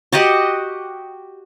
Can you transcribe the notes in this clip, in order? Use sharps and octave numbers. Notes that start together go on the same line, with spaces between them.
F#4 G4 D#5 F#5